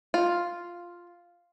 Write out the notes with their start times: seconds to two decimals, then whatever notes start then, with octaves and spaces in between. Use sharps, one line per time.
0.14 F4